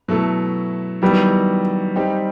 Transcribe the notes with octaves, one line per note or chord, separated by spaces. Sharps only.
B2 F#3 A3 E4 A4
D#3 F#3 G3 B3 E4
G3 C4 D#4 G4